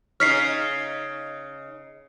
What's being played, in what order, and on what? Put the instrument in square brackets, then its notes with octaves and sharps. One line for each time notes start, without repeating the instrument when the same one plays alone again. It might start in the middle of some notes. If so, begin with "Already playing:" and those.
[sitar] C#3 D#4 C#5 [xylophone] F6 B6 C7